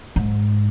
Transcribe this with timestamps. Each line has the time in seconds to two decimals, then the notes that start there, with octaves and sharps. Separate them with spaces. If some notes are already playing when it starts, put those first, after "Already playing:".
0.16 G#2